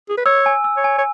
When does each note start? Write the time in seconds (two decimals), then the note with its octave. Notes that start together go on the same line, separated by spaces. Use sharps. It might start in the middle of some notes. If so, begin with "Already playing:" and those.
0.09 G#4
0.18 B4
0.26 C#5 E6
0.46 G#5
0.64 E6
0.77 C#5
0.84 G#5
0.98 C#5